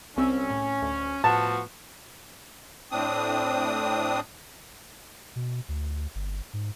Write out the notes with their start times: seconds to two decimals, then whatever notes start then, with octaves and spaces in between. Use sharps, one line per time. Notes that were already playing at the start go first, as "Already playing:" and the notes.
0.17 C2 C4 C#4 E6
0.50 A2
0.82 D2
1.24 A2 F3 B3 F#4 A5
2.91 A2 C4 D4 D#6
5.36 B2
5.68 D2
6.15 G1
6.53 G#2